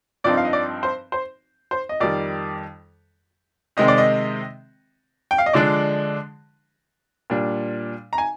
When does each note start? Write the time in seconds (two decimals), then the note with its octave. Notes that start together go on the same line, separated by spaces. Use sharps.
0.24 G2 F3 C4 D#4 D5
0.37 F5
0.45 D#5
0.53 D5
0.83 C5
1.12 C5
1.71 C5
1.89 D#5
2.00 F2 D#3 G3 D5
3.77 C3 D#3 G#3 C4 D#5
3.88 D5
3.98 D#5
5.31 G5
5.38 F5
5.46 D#5
5.53 D3 F3 G#3 D4 D5
7.30 A#2 G3 D4
8.13 A#5
8.18 G#5